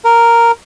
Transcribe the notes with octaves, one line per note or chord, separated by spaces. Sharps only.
A#4